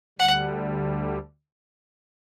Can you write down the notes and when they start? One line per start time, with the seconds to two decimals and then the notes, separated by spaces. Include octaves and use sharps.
0.19 D2 D3 G3 F#5